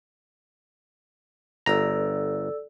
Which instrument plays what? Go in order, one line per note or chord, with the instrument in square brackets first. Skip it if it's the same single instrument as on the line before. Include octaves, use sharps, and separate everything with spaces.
[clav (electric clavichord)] G1 A#5 [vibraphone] A4 D5 E6